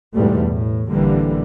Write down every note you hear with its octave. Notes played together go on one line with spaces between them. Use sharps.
E2 G#2 B2 G3 A3
A2
A1 D3 E3 G3 A#3